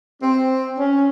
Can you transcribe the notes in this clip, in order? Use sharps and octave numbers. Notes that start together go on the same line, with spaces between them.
C4
C#4